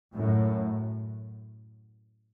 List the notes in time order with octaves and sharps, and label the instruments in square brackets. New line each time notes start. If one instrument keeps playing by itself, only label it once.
[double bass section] F#2 A2